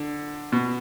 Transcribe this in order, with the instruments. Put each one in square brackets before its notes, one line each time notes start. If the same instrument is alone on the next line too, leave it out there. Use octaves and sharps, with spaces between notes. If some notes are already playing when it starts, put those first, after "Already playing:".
Already playing: [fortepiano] D3
B2